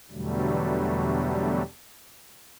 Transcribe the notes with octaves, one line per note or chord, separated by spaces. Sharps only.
E2 B2 D3 F#3 G3 A3